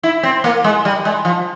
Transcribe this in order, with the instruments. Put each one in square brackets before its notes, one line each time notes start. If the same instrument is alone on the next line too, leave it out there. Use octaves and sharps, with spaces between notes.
[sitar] E4
C4
A#3
G#3
G3
G#3
F3